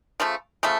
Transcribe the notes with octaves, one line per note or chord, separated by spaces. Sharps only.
C#3 F3 A3
C#3 F3 A3